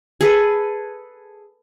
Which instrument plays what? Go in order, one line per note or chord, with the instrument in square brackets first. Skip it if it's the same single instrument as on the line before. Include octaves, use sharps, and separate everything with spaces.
[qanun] G#4 A4 B4